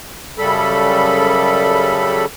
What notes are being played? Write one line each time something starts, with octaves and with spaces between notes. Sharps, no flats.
F#2 C#3 G3 A4 B5